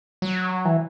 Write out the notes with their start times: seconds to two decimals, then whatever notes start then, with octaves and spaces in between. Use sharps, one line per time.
0.22 F#3
0.65 E3